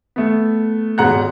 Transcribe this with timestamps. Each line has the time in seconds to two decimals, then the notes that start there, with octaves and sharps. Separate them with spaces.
0.16 A3 B3
0.98 D#1 G#2 B2 F#5 A#5 F#6